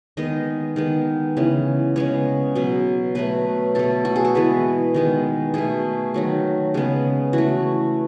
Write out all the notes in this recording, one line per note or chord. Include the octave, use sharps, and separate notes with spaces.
D#3 G#3 B3 D#5
D#3 G#3 B3
C#3 E3 B3
C#3 G#3 B3 C#5
B2 F#3 B3
B2 F#3 A3 B4
B2 A3 A4
F#4
G#4
A4
E3 G#3 B3 B4
D#3 G#3 B3
B2 A3 G#4
D#3 F#3 A3
C#3 G#3 B3
E3 A3 F#4